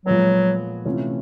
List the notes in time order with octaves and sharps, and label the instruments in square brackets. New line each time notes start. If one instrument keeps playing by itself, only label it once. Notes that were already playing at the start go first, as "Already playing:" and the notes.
[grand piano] A#2 F3 G#3 B3 [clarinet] F#3
[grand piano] C3 E3 A3 C#4 F4